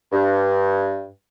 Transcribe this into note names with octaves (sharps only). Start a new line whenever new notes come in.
G2